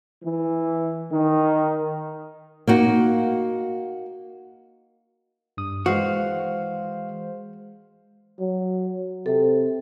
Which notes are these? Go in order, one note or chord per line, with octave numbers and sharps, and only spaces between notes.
E3
D#3
A#3 D#4 F#4
G2 D#6
E3 G#3 F#4 C5 F5
F#3
C3 A4 C5